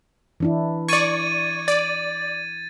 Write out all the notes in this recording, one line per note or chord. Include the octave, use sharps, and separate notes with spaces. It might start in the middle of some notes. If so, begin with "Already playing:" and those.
E3 D4 E4
D5 C#6 G#6 A6 D#7
D5 A6